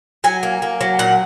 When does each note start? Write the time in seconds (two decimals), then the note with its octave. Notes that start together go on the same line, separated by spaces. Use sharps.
0.24 F#3 G#5
0.43 A#3
0.62 A#3
0.81 F#3
0.99 A#2 F#5